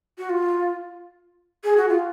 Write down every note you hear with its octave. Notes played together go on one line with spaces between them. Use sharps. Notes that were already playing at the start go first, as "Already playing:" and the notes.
F#4
F4
G#4
F#4
F4